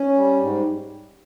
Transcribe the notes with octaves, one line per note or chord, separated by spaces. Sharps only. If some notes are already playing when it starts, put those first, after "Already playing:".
Already playing: C#4
G3
G#2